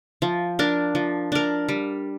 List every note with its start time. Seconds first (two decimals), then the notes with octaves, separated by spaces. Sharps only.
0.22 F3
0.59 D4 A#4
0.95 F3
1.32 D4 A#4
1.69 G3